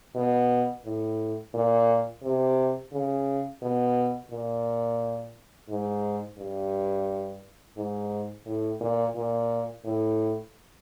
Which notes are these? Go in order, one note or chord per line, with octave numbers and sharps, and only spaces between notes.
B2
A2
A#2
C3
C#3
B2
A#2
G#2
G2
G#2
A2
A#2
A#2
A2